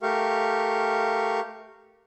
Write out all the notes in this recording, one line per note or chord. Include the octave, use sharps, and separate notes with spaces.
A3 G4 A#4 F5 C#6